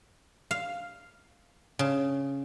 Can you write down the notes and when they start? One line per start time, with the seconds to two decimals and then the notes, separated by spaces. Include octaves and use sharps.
0.51 F5
1.79 C#3